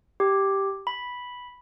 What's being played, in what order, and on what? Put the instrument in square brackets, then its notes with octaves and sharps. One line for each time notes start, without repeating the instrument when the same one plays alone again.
[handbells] G4
B5